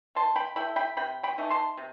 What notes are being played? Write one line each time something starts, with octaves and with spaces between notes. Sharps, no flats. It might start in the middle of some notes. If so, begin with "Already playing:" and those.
D#3 A5 C6
G5 B5
A3 E4 G5 B5
G5 B5
C3 G5 B5
G5 B5
E3 A3 D#4
A5 C6
C3